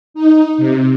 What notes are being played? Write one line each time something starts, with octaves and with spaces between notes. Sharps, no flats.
D#4
C3